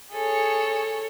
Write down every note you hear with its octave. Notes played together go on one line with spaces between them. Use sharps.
G#4 A4 C#5